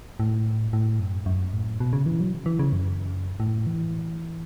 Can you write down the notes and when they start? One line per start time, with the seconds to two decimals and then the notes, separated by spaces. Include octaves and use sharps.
0.20 A2
0.73 A2
1.00 F#2
1.26 F#2
1.53 A2
1.80 B2
1.93 C#3
2.06 E3
2.20 F#3
2.46 E3
2.59 C#3
2.73 F#2
3.40 A2
3.67 E3